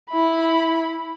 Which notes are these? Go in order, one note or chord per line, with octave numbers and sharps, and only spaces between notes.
E4 B5